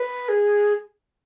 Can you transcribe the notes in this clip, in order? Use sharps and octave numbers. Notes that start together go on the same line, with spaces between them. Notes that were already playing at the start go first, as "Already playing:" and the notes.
Already playing: B4
G#4